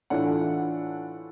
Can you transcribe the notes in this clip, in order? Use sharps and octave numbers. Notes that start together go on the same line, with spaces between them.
A2 E3 A3 D4 F4 F#5